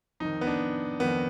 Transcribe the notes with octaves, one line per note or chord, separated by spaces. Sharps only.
F2 D#3 D#4
B3
D4
F2 D#3 B3